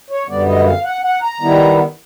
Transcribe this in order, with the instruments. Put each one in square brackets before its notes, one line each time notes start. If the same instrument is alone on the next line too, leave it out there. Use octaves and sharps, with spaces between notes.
[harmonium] C#5
F#2 D3 G3 B3 D5
D#5
F5
F#5
F#5
A#5
D#3 G3 B3 E4